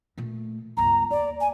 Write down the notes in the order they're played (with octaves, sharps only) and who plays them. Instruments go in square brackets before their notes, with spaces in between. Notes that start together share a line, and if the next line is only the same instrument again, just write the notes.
[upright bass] A#2 A3
[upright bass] G1 C#2 [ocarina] A#5
[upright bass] D#2 [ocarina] D5
[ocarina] G#5